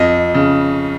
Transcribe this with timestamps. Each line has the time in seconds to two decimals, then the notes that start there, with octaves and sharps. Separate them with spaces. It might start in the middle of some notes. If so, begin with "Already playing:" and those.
Already playing: F2 D#5
0.34 C#3